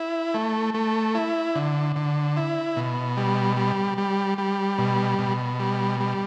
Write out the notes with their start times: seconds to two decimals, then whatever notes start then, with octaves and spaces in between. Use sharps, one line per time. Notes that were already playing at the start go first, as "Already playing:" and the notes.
Already playing: E4
0.34 A3
0.74 A3
1.15 E4
1.55 D3
1.96 D3
2.37 E4
2.76 B2
3.17 G3
3.57 G3
3.98 G3
4.38 G3
4.78 B2
5.19 B2
5.59 G3
6.00 G3